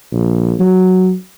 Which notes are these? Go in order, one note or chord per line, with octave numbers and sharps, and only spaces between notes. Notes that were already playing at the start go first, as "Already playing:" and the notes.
A#1
F#3